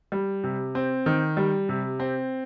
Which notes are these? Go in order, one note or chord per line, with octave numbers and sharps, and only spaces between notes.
G3
C3
C4
D#3
G3
C3
C4